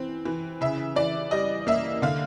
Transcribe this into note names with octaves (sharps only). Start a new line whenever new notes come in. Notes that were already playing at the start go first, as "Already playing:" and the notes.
Already playing: E3 C4
E3
C#3 E5
E3 D5
G3 D#5
A#3 E5
D3 F5